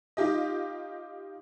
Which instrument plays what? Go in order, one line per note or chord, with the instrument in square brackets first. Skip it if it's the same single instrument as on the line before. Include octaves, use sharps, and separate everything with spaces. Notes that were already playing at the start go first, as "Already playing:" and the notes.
[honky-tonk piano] D#4 F4 G4 D#5